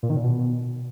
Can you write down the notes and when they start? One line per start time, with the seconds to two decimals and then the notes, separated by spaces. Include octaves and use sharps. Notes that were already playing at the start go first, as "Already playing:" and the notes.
0.03 A#2
0.10 D#3
0.17 A#2
0.24 B2